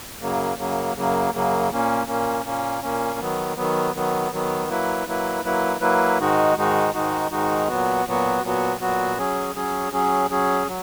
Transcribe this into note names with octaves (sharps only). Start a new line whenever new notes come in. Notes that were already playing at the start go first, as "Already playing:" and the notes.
F#2 C#3 F#3 A#3
F#2 C#3 F#3 A#3
F#2 C#3 F#3 A#3
F#2 C#3 F#3 A#3
A#2 A#3 C#4
A#2 A#3 C#4
A#2 A#3 C#4
A#2 A#3 C#4
D#3 F#3 B3
D#3 F#3 B3
D#3 F#3 B3
D#3 F#3 B3
F#3 A#3 E4 B4
F#3 A#3 E4 B4
F#3 A#3 E4 B4
F#3 A#3 E4 B4
G#2 D#3 G#3 D#4 F#4
G#2 D#3 G#3 D#4 F#4
G#2 D#3 G#3 D#4 F#4
G#2 D#3 G#3 D#4 F#4
A#2 F#3 B3 F#4
A#2 F#3 B3 F#4
A#2 F#3 B3 F#4
A#2 F#3 B3 F#4
F#3 C#4 G#4
F#3 C#4 G#4
F#3 C#4 G#4
F#3 C#4 G#4
F#3